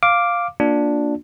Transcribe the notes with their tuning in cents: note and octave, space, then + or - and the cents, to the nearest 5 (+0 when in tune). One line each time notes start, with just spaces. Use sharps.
F5 +0 D6 +0
A#3 +0 D4 +0 F4 +30